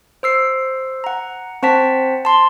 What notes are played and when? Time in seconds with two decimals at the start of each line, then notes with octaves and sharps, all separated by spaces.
0.23 C5 E6 C7
1.04 F#5 A#5
1.63 C4 C5 F#5 A5 B6
2.25 A5 C6